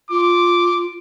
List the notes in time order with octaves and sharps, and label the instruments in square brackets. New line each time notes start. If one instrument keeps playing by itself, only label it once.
[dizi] F4 [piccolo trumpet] D6